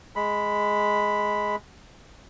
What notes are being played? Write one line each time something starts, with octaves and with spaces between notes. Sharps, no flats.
G#3 B5